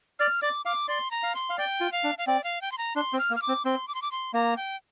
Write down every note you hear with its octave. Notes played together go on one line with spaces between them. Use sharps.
D5 F6
D5 D6
F5 D6
D5 C6
A#5
F5
C6
F5
D5 G5
F4
F5
D4
F5
C4 D5
F5
G5
C6
A#5
D4 C6
C4
F6
A#3
F6
D6
C4
C4 C6
D6
C6
D6
C6
A#3 A#5
G5